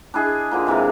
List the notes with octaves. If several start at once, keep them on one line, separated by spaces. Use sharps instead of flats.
D4 E4 G#4 D#5
D3 F3 A#3
C3 E3 G#3 A#3